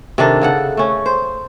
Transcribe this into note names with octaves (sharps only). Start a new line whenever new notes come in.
C3 D#3 D4 A4
C#3 A4 F#5
A3 C#4
C5